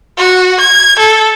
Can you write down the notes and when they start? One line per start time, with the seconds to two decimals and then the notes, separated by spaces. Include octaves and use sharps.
0.18 F#4
0.60 G#6
0.99 A4